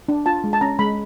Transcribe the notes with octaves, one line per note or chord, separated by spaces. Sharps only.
D4
F4 A5
G#3
A5
C#4 A#5
G#3 B5